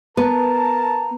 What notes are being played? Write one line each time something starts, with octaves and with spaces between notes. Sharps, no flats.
B3 A#4 B4 A5 A#5